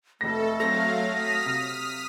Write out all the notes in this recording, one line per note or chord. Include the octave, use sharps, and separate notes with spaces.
F1 A3 A4 A#6
F#3 C4 A4 F5 A#6
D#6 F6 B6
C3